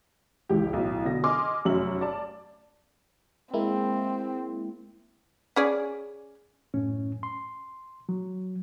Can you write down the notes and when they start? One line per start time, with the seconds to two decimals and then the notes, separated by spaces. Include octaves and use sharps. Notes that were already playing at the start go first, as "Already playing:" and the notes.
0.49 G#1 C#2 E3 F4 G4
0.73 B1 A2
1.05 B2 D3 A#6
1.24 D#5 G#5 C6 D6 F6
1.65 F1 F#2 F#3 C#4 E5 F#7
2.01 D5 A5
3.53 G#3 A#3 C4 E4
5.56 C#4 G#4 D5
6.74 F#2 A2 C#4
7.23 C6
8.09 F#3